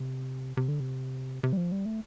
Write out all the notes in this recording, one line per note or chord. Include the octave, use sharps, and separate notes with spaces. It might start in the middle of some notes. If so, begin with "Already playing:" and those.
Already playing: C3
C3
D3
C3
C3
G3
F3
G3
A3